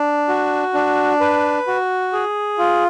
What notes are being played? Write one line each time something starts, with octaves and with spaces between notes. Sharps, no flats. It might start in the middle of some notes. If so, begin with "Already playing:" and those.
Already playing: D4
F#4
D4
B4
F#4
G#4
F4